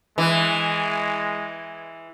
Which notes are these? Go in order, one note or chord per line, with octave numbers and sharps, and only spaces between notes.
E3 G#3